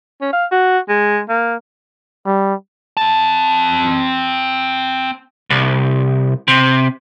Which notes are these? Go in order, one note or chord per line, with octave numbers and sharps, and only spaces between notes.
C#4
F5
F#4
G#3
A#3
G3
C4 A5
C2
C3